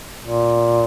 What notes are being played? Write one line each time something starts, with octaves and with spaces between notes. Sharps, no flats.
A#2